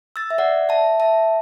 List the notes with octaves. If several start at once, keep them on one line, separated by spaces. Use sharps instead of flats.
E6 A6
E5
D5 F#5
E5 A5
E5 A5